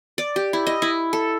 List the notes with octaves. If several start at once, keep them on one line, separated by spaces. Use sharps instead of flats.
D5
G4
E4
D#5
E4
A4